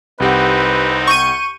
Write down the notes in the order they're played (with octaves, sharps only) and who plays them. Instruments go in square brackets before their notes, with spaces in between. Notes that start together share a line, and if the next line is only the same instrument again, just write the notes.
[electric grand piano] C2 G4 F#5 [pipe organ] C4 D#4 [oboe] B4
[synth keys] C#6 G6 D#7